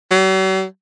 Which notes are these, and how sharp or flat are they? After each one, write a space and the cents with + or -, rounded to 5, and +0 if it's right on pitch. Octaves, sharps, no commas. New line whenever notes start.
F#3 +45